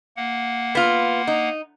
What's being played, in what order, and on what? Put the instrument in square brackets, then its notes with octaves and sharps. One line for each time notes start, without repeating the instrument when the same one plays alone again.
[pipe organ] A#3 F#5
[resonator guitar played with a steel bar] B3 F4
D#4